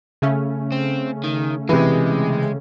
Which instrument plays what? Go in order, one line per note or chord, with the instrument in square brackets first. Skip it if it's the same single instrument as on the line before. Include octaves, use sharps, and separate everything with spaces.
[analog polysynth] C#3 A3 C#4
[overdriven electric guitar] C4
D#3
[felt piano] C3 E3 [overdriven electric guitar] G#3